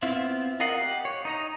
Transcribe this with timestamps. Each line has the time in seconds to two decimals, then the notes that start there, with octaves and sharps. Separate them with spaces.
0.02 B3 C4 E4 F4 E5
0.60 F4 A#4 D#5 F5 F#5
0.77 G4 F#5
1.05 C#5
1.25 D#4 D#5 A#5